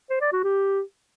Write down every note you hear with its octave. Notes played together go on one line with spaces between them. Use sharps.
C5
D5
F#4
G4